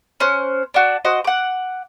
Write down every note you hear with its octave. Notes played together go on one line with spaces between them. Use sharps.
C#4 C5 F#6
D4 F#4
F#4 C5 D#5
F#5 D6